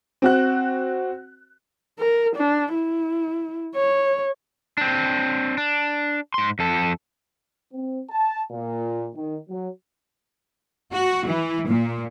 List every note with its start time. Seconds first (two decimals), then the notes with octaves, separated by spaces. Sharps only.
0.22 C4 F#4 F#6
1.98 A#4
2.35 D4
2.74 E4
3.75 C#5
4.78 C4 D4
5.58 D4
6.34 G#2 C6
6.59 F2 A4
7.73 C4
8.10 A5
8.50 A#2
9.15 D#3
9.48 F#3
10.93 F#4
11.27 E3
11.68 A#2